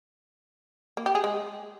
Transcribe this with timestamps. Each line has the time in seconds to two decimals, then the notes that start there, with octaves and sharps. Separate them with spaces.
0.97 A#3
1.06 G4
1.15 G#4
1.24 G#3